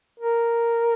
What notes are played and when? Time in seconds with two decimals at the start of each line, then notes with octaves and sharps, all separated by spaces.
0.20 A#4